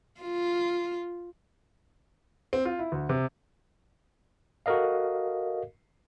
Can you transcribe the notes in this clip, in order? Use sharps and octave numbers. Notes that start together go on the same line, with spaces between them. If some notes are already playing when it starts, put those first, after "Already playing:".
F4
C4
F4
E4
D2
C3
F#4 A4 A#4 D#5 F5